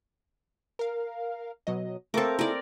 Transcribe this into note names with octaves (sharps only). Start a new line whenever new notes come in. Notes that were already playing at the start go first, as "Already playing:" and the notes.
A#4 F5
B2 F#3 D#5
A3 A#3 C4 A4 A#4 D6
D#4 E4 G#4 A#4 D5